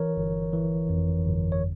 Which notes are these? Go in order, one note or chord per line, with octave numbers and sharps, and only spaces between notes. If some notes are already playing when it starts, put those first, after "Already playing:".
Already playing: E3 A#4 C#5
G1
E3
F2
G1
C#5